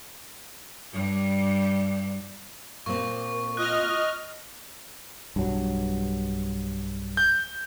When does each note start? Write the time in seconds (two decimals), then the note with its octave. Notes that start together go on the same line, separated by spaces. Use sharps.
0.92 G2 G3
2.86 A#2 A#3 C4 A#4 C#6
3.57 F4 D#5 F6 F#6
5.36 B1 G2 F#3
7.17 G6